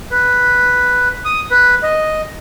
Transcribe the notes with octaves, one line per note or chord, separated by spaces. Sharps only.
B4
D#6
B4
D#5